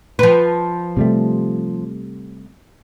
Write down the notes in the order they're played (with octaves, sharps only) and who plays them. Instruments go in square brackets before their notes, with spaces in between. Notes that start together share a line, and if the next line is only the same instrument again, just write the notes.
[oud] F3 B4
[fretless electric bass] C3 G3 A3